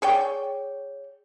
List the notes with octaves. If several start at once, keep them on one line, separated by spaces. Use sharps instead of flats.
G#4 C#5 D5 G5